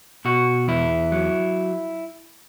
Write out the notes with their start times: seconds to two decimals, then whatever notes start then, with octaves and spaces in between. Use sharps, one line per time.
0.25 B2 F#4
0.68 E2 E4
1.12 F#3